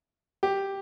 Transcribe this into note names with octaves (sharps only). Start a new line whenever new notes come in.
G4